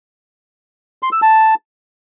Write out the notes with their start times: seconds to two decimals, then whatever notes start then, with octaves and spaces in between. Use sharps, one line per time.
1.03 C6
1.12 E6
1.22 A5